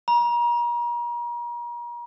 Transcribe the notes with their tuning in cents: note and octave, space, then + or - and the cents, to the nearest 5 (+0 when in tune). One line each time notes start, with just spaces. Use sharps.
A#5 +40